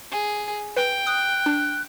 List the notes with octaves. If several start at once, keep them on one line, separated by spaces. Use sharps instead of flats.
G#4
B4 G5
D#6 F#6
D4